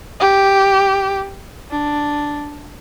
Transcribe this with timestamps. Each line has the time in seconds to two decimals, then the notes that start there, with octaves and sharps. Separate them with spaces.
0.20 G4
1.71 D4